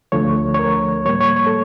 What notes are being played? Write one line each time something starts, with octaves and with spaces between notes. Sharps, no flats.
D2 D3 F3 A3 C#5
C#5
A#4
A2 G3 A#3 C#5
C#5
C#5
A4